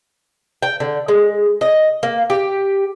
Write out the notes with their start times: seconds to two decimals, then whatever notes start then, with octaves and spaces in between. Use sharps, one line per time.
0.63 G5
0.80 D3
1.08 G#3
1.61 D#5
2.03 A#3
2.30 G4